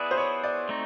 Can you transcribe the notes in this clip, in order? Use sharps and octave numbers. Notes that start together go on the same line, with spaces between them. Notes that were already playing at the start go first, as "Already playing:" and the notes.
Already playing: B3 E4 G#4 B4 D5
C5
C#5
D5
A3 C4 D#4